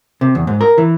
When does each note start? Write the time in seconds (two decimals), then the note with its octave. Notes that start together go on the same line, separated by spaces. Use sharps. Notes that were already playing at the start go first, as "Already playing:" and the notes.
0.21 C3
0.35 E2
0.47 G#2
0.61 A#4
0.78 E3